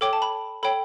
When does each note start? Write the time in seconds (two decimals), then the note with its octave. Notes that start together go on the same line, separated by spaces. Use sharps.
0.01 A4 C#5 G5 D6
0.13 A5
0.22 B5
0.63 A4 C#5 G5 B5